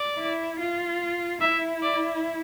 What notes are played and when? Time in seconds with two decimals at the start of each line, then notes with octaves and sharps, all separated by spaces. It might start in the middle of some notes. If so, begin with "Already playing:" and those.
Already playing: D5
0.19 E4
0.60 F4
1.41 E4 E5
1.83 D5